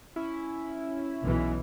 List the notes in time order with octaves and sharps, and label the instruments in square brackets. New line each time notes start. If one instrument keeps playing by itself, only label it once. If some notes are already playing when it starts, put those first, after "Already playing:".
[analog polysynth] C#4 E4
[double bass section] B1 E3